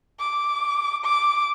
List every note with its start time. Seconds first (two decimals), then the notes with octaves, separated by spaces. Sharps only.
0.20 D6
1.04 D6